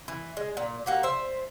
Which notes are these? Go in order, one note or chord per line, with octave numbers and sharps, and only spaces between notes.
E3
G#3
A#2
A#3 F#4 G4
C5 E5